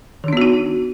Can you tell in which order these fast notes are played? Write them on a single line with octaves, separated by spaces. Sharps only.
D#3 D4 B3 F#4 D#4